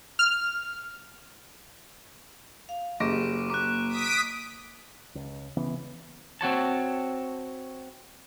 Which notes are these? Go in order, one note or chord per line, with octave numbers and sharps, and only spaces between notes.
F6
F5
F#1 G4 C#6 D6 A#6 D7
A#3 D6 F#6
D#6 B6 D7
C#2
C#2 C#3 E3 B3
C4 F#4 C#5 A5